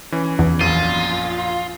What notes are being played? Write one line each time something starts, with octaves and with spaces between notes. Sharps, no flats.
E3 C#4
E2
A#1 F#2 F4 D#7